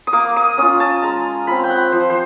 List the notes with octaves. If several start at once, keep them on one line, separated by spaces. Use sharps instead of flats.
D#6
A#3 D6
D#6
C#4 F4 D#6
A5
G#3 A#5
C4 F4 B5
G5
F#5
F3 C5
C5